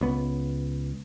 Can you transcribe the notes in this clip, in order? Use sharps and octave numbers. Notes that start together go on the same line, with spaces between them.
C#2 B3